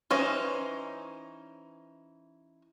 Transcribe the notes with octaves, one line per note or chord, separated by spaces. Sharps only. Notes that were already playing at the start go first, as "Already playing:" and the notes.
E3 C#4 D#4 C5